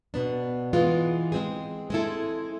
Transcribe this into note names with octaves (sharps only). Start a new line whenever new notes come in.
B2 B3 D4
E3 G#3 B3 F4
G#3 C4 G#4
G#3 C4 E4 A4